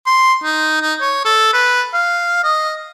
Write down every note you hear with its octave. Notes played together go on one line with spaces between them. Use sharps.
C6
D#4
D#4
C#5
A4
B4
F5
D#5